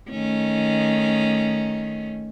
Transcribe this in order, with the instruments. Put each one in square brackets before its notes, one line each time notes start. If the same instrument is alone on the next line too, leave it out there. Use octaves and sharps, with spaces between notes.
[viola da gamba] D#3 A3 C#4